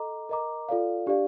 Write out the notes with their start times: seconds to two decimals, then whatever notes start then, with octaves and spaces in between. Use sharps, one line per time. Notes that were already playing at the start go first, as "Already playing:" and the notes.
Already playing: A4 D#5 A#5 D6
0.29 A#4 D#5 A#5 D6
0.69 F4 A4 D5 F5
1.06 D4 G4 D5 F5